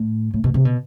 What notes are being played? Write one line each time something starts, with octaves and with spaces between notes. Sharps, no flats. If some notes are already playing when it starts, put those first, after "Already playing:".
Already playing: A2
A2
B2
C3
B2